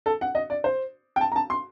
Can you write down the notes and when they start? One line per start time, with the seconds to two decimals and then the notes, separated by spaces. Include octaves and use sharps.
0.06 A4
0.21 F#5
0.35 D#5
0.50 D5
0.64 C5
1.16 G5
1.21 A5
1.32 A#5
1.36 A5
1.50 C6